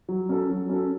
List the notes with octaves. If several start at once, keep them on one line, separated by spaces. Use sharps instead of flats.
F#3
C#4 F#4 A4
F#3
C#4 F#4 A4